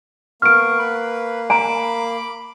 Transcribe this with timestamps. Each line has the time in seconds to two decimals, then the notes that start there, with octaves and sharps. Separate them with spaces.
0.42 A#3 B3 C#6 F6 D7
0.79 B4 B5
1.50 G#5 A#5 B5 D6